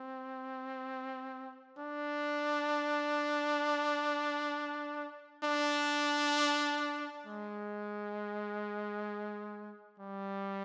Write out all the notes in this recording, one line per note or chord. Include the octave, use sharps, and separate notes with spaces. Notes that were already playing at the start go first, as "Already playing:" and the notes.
Already playing: C4
D4
D4
G#3
G3